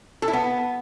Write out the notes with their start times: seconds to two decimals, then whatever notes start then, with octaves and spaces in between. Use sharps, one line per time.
0.22 A4
0.28 E4
0.33 B3